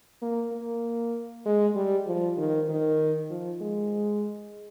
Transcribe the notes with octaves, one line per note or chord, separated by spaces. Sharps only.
A#3
A#3
G#3
G3
F3
D#3
D#3
F3
G#3